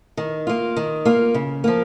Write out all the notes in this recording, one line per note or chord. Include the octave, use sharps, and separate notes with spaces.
D#3
A#3 F4
D#3
A#3 F4
C#3
F3 A#3